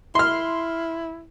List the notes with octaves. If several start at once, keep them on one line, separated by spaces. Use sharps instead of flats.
E4 C6 F6